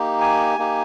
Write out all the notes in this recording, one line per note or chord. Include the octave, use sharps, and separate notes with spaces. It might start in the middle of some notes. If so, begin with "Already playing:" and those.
Already playing: A#3 D#4 G4
G#5
A#3 D#4 G4